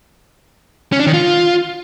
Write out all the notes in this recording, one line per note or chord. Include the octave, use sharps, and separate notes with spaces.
C#4
D4
D#3
F4